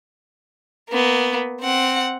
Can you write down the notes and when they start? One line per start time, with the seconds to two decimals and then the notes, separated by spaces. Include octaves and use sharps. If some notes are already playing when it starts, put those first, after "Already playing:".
0.90 A#3 B3
1.61 C4 F#5